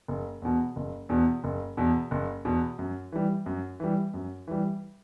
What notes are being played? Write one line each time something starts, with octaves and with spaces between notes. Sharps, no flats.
F#1
E2 B2
F#1
E2 B2
F#1
E2 B2
F#1
E2 B2
F#2
E3 G3
F#2
E3 G3
F#2
E3 G3